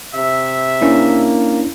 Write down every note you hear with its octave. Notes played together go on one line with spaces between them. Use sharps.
C3 E5
A#3 C#4 D4 E4